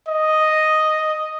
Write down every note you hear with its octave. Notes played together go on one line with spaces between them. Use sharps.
D#5